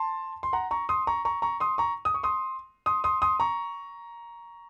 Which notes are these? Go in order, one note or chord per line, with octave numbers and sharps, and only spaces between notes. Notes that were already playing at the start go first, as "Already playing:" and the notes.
Already playing: A5 C6
C6
F#5 A#5
A#5 C#6
C6 D#6
A#5 C#6
A#5 C#6
A#5 C#6
C6 D#6
A#5 C#6
D#6
C#6
C6 D#6
C6 D#6
C6 D#6
C6 D#6
A#5 C#6